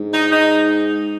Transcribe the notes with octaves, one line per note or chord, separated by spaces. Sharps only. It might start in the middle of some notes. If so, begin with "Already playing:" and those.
Already playing: G#2
D#4
D#4